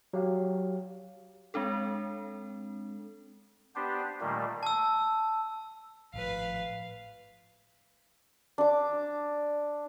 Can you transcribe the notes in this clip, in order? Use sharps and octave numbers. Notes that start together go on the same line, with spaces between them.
F#3 G4 F5
G#3 C4 D4 A4
B3 D4 G4 C5
A#2 D#3 G3 A3 A#3
A5 E6
G#1 A2 F3 B4 F5
D4 D6